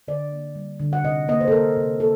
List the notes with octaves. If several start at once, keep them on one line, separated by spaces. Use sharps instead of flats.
D3 D5
A#3
G3
D3
F#5
C3 D#5
A#3 D#5
C5
A4
A#3 A#4
C3
A#3 A4